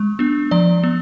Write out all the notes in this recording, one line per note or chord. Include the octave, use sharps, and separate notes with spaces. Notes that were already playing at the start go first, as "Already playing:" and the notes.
Already playing: G#3
B3 D4
F3 D5
B3